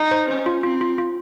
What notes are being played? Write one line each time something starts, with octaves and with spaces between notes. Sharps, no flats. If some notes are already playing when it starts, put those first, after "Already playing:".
Already playing: D#4
C5
C#4 C5
F4
C4 F4
F4
F4